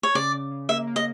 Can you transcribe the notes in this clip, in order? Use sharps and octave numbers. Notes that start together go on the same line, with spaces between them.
C#5
C#3 D5
C#3
C#3
A#3 E5
A#3
D#5